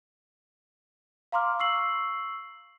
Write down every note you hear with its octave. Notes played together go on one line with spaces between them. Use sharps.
F5 A#5 C6 D6 F6
C#6 E6 C7 F#7